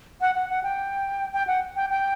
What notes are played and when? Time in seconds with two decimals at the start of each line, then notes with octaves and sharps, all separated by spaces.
0.21 F#5
0.35 F#5
0.49 F#5
0.63 G5
1.33 G5
1.47 F#5
1.76 G5
1.90 G5